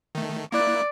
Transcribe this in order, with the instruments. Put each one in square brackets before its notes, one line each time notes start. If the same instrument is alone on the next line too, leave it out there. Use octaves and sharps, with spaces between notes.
[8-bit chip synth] D#3 A3
[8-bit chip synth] A#3 E4 F#6 [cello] D5